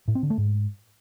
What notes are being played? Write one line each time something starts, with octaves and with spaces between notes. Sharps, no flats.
A2
C4
D3
A3
G#2